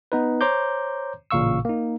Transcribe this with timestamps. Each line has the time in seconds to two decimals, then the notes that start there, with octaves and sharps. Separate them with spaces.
0.12 B3 D#4 B4
0.41 C5 C#5 A#5 C6 D6 G6
1.31 A1 A#2 C#3 F5 C#6 E6
1.65 A#3 D#4